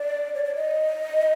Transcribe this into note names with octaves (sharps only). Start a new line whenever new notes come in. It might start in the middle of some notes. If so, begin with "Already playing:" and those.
Already playing: D5
C#5
D5
D#5